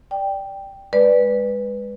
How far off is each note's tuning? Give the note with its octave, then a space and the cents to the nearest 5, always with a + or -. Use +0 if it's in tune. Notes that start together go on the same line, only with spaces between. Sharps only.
D5 +0 G5 +0
G#3 -20 B4 +0 D5 +0